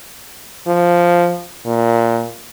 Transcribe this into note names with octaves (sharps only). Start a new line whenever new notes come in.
F3
A#2